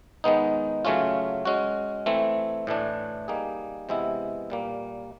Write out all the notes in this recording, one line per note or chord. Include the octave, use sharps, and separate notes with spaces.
D#3 G#3 B3 D#4
C#3 F#3 A3 C#4 F4
G#3 C#4 F#4
E3 A3 C4
A2 E3 A3 D4
G3 A#3 D#4 G#4
C3 E3 G#3 B3 E4
A#2 G3 A#3